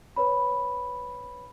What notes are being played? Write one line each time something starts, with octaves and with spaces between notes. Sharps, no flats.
B4 C#5 B5